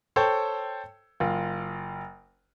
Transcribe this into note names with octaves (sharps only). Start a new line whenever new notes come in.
A4 C5 C#5 G5
F#1 F4